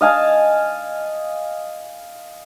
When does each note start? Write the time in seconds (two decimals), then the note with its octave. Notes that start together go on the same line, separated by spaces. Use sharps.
0.01 D#5 F5 G#5 A5